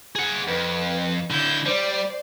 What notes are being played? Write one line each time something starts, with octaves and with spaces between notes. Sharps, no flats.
G#4 F#5
F2 B4
D3 E4 G6
G3 C5 D5